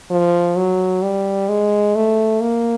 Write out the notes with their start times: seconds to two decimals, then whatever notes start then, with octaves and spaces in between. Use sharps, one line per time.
0.10 F3
0.56 F#3
1.03 G3
1.49 G#3
1.95 A3
2.41 A#3